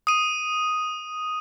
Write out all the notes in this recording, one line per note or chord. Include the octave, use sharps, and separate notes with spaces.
D#6 D#7